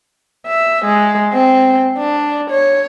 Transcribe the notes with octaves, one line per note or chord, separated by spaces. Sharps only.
E5
G#3
C4
D4
C#5